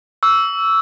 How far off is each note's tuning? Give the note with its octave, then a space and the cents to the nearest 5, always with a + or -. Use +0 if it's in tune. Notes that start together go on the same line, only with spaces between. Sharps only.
C#6 +45 E6 +0